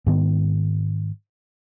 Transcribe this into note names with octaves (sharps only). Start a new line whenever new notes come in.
G#2 D#3 B3